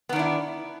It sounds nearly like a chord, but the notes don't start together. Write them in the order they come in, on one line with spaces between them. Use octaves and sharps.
B3 D#3 D4 E4